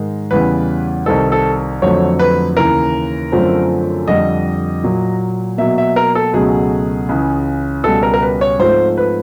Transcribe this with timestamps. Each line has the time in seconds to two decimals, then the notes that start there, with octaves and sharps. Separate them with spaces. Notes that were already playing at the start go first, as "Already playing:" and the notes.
Already playing: G#2 D#3 G#3
0.31 E2 C#3 E3 G3 B4
1.06 C2 C3 D#3 G3 C4 A4
1.32 A4
1.82 F2 D3 F#3 A3 C4 C#5
2.19 B4
2.57 D#2 C#3 E3 A#4
3.32 F#2 D3 F3 A3 C4
4.07 F2 D3 G3 D#5
4.84 A#2 F#3 A#3
5.58 B2 F#3 A#3 E5
5.78 E5
5.96 A#4
6.15 A4
6.33 C#2 B2 F#3 A3 G#4
7.09 C#2 C#3 E3
7.84 C#2 B2 G3 A4
8.03 A#4
8.14 A#4
8.23 B4
8.41 C#5
8.59 G#2 F3 A3 C4 C5
8.98 B4